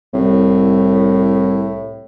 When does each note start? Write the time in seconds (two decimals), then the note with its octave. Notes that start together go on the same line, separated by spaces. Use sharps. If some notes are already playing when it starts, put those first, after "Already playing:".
0.14 C2 A2